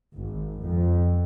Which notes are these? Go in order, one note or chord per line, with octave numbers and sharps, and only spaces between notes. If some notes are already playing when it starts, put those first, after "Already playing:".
G#1
F2